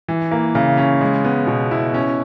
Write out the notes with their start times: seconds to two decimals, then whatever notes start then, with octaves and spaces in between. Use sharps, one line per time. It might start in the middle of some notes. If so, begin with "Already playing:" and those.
0.08 E3
0.31 A#3
0.55 C#3
0.77 C#4
1.01 G#3
1.24 B3
1.47 B2
1.71 E4
1.94 C#4